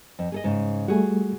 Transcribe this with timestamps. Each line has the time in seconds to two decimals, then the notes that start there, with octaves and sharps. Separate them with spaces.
0.19 F2
0.32 G#4 A4 D#5
0.44 G#2 C#3
0.88 G3 A3 F#4 G#4